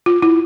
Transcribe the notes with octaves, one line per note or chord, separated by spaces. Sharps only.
F4
E4